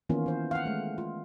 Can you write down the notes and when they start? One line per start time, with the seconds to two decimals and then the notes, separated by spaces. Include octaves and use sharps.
0.09 D#3 E3 A#3 B3 C#4 F4
0.26 E3 C5
0.51 F5 F#5
0.65 G#3 A3
0.98 F4